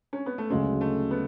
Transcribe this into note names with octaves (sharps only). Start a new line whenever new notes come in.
C#4
B3
A3
D2 C#3 F#3 G#3 C#4
A3
B3